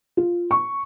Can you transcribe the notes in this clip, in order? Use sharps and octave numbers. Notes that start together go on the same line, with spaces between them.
F4
C#6